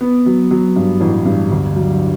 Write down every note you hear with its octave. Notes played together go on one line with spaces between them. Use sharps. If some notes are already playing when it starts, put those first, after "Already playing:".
B3
F#3
F#3
G2
A1
G2
D2
F#3